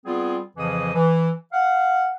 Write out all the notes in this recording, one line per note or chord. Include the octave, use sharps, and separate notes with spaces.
G3 B3 C4 F4 G#4
F2 C#3 E3 F3 D#5 D#6
E3
F5 F#5